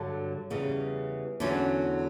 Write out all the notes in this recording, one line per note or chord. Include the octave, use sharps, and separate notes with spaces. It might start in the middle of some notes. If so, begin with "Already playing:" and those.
Already playing: G2 D3 F#3
E2 C#3 E3 G3
E2 D3 F#3 C#4